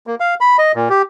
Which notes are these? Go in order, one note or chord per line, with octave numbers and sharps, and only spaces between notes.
A#3
F5
B5
D#5
A#2
G4